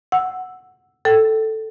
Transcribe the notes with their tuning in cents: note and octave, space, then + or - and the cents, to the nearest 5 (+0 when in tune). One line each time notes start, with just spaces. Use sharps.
F#5 +0 E6 +0
A4 +0 G5 -30